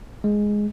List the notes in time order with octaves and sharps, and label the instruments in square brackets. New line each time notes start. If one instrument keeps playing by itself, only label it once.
[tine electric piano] G#3